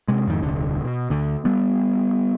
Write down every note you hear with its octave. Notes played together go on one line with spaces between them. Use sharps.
C3 G#3
F2 G#2 D#3
D#1 C2 D3
B2
D2 D3
G3 B3